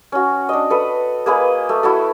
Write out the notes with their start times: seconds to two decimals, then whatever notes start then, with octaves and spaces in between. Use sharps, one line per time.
0.12 C#4 F#4
0.49 D4 D#5
0.70 A4 B4 D#6
1.26 A#3 G#4 B4 D#5
1.69 A3
1.83 E4 F#4 A4